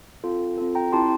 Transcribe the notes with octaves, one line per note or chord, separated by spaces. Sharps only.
C4 F4 A4
C4 F4 A4
G5 A#5
C4 E4 G4 A5 C6